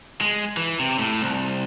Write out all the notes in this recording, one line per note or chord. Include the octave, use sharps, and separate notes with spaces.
G#3
E3
C3
A2
C2